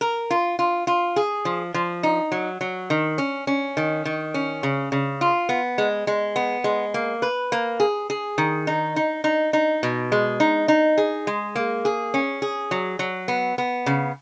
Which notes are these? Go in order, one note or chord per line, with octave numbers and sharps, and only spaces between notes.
A#4
F4
F4
F4
G#4
F3
F3
D#4
F#3
F#3
D#3
C#4
C#4
D#3
D#3
C#4
C#3
C#3
F4
B3
G#3
G#3
B3
G#3
A#3
B4
A#3
G#4
G#4
D#3
D#4
D#4
D#4
D#4
B2
G#3
D#4
D#4
G#4
G#3
A#3
G#4
C#4
G#4
F#3
F#3
B3
B3
C#3